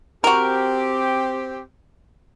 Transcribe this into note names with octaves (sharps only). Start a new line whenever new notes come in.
C4 F#4 G4 A#4